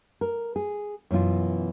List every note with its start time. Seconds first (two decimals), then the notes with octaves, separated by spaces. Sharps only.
0.21 A#4
0.56 G#4
1.11 F#2 B2 E3 F4